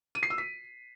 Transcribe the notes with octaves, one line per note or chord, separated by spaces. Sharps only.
D#7
C7
E6
B6